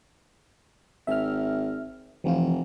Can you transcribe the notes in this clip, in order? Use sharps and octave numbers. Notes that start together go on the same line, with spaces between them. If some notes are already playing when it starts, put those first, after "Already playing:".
G#1 E5 F6
F1 E3 F3 F4